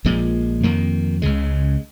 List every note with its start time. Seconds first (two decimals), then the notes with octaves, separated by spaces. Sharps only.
0.05 A#1 A#2 F3 G#3
0.63 F2 D#3 A#3
1.22 C#2 C#3 G#3